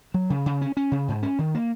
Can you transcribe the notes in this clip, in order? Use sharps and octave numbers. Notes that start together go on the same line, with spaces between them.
F#3
C#3
C#3
C#4
C#4
C#3
G#2
C#4
D#3
A#3